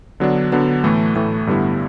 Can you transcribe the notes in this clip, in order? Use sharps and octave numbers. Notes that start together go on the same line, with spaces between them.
D3 F#3 B3 D4
D3 F#3 B3 D4
A2 E3 A3
A2 E3 A3
G2 D3 G3 B3 E4